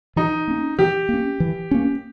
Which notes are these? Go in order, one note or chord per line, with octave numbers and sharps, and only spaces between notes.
E3 D#4
A#3 C#4
E3 G4
A#3 C#4
E3
A#3 C#4